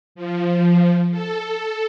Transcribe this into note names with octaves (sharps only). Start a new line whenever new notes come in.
F3
A4